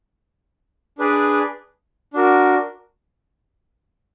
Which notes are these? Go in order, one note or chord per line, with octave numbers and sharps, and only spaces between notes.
D4 G#4 B4 D5
D4 F#4 A#4